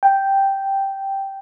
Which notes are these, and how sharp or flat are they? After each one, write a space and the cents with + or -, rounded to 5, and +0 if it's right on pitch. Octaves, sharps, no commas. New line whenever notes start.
G5 -5